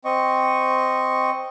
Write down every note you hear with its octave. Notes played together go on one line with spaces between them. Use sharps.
C4 D#5 C#6